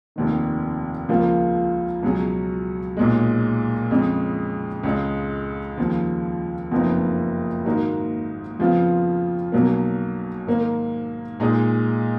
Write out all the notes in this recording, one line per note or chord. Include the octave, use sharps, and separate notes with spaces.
F1 D#2 D#3
C#2 C#3 F3 A#3 F4
C#2 B2 F#3 C#4 G#4
B1 A#2 G#3
F2 C#3 G#3 C#4
C#2 C#3 G#3
D#2 C#3 F3
F#1 F2 F3 B3 D#4
G#2 D#3 A#3 D#4 F#4
F2 C#3 F3 B3 F4
B1 B2 F#3 A#3
G#2 D#3 A#3
A#2 G#3 D#4 G#4